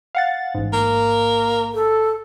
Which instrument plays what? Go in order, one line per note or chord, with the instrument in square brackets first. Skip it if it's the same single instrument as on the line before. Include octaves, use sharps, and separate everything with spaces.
[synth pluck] F5 F#5 A6
A1 G#2
[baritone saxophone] A#3
[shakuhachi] A4